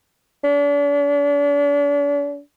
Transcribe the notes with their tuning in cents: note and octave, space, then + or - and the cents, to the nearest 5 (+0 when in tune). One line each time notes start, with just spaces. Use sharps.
D4 -40